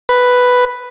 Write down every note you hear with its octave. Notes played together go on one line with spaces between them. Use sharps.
B4